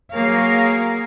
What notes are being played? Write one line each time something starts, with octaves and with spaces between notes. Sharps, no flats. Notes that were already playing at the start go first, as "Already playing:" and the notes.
F#3 A#3 G#4 A#4 C#5 F5